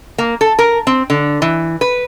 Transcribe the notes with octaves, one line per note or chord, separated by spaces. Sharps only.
A#3
A4
A#4
C4
D3
E3
B4